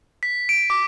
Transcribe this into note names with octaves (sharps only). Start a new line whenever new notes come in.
B6
D7
D6